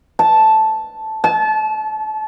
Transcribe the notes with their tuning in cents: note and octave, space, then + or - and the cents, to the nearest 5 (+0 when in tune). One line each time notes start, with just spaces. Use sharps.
A5 -5
A5 -30